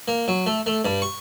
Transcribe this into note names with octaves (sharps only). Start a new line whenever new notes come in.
A#3
F#3
A3
A3
G2
C#6